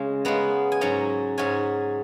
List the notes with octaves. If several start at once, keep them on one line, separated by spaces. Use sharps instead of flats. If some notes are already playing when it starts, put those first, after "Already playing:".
Already playing: C#3 G#3
C#3 G#3 B3 A#5
G#5
G#2 F#3 C#4 A#5
G#2 F#3 C#4 G#5